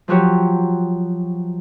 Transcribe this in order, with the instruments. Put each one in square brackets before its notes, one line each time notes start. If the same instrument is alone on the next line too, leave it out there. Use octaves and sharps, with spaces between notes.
[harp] F3 F#3 F#4 G4 C#5